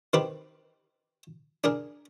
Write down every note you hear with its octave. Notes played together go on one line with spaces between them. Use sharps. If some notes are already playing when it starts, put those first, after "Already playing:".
D#3 C4 G4 B4
D4 G#4 A#4